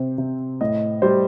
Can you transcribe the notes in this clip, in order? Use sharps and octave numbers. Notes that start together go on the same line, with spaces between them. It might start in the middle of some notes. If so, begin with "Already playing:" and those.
Already playing: C3 C4 C5
C3
A2 D#5
G3 C5